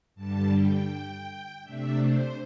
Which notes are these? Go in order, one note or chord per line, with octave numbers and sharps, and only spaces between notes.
G2 D3 G3 A5
G5
C3 A3 D4 E5
C5